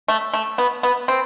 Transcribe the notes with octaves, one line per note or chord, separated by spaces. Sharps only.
A3
A3
B3
B3
C4